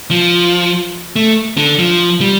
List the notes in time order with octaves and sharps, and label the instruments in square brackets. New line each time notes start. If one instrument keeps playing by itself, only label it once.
[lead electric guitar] F3
A3
D3
F3
G3